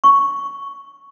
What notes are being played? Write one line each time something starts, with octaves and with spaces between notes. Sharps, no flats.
C#6